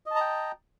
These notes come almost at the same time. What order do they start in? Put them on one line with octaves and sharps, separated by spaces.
D#5 A5 A#5 G5